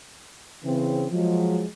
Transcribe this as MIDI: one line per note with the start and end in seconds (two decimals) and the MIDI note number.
0.64 1.07 49
0.64 1.07 52
0.64 1.07 60
1.12 1.65 53
1.12 1.65 54
1.12 1.65 56